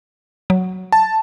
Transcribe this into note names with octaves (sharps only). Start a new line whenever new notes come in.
F#3
A5